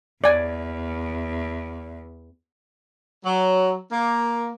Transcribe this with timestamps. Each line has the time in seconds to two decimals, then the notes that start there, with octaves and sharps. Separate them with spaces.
0.24 E2 D5 G#5
3.26 F#3
3.92 A#3